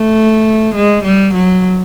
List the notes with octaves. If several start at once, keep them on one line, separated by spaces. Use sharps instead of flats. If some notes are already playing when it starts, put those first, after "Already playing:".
Already playing: A3
G#3
G3
F#3